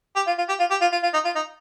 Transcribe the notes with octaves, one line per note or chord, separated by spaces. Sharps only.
G4
F4
F4
G4
F4
G4
F4
F4
F4
D#4
F4
D#4